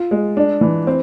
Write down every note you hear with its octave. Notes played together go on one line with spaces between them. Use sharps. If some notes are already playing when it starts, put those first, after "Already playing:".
Already playing: F4
G#3
D4
E3
C4